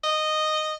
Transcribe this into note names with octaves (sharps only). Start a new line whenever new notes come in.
D#5